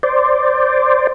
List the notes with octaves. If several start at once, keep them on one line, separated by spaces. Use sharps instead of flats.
C5 D5